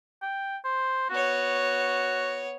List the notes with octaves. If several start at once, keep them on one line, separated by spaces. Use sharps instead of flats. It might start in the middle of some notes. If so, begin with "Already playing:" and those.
G5
C5
B3 F#4 C#5